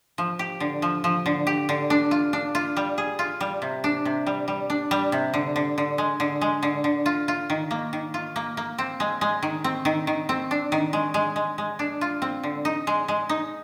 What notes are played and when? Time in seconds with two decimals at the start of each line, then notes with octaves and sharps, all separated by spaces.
0.18 F3
0.39 G4
0.60 D3
0.82 F3
1.04 F3
1.26 D3
1.47 G4
1.69 D3
1.90 D4
2.11 F4
2.33 D4
2.55 F4
2.77 G3
2.98 G#4
3.19 F4
3.41 G3
3.62 C3
3.84 D4
4.05 C3
4.27 G3
4.48 G3
4.70 D4
4.91 G3
5.12 C3
5.34 D3
5.56 D3
5.78 D3
5.98 G#3
6.20 D3
6.41 G#3
6.63 D3
6.84 D3
7.06 F4
7.28 F4
7.50 D#3
7.71 A#3
7.93 D#3
8.14 F4
8.36 A#3
8.57 A#3
8.78 C4
9.00 G#3
9.21 G#3
9.43 D#3
9.64 C4
9.85 D#3
10.07 D#3
10.29 C4
10.51 D4
10.72 D#3
10.93 G#3
11.14 G#3
11.36 G#3
11.58 G#3
11.79 D4
12.01 F4
12.22 C4
12.44 D3
12.65 D#4
12.87 G#3
13.08 G#3
13.29 D#4